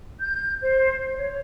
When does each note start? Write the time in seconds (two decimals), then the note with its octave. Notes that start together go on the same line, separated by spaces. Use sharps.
0.20 G6
0.61 C5
1.14 C#5